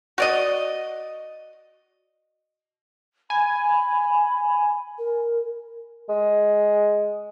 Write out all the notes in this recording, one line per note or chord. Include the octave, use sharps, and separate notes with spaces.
F#4 D5 D#5
G#5 B5
A#4
G#3